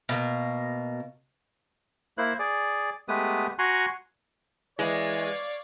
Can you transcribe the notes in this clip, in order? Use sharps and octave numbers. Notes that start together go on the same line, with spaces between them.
B2 A#3
A#3 E4 C5 F#6
G#4 D5
G#3 A3 B3 G4 B4 D#6
F#4 G#5 A#5 C6 C#6 F#6
E3 G#3 C#5 D5 F5